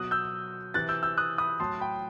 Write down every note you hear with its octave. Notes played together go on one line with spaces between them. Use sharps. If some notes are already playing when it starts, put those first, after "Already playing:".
Already playing: B2 F#3 D#6 F#6
E6 G6
C3 E3 F#6 A6
E6 G6
E6 G6
D#6 F#6
B5 D#6
A2 F#3 A5 C6
G5 B5